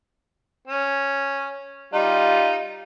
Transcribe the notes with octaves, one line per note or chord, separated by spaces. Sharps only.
C#4
G3 D#4 F4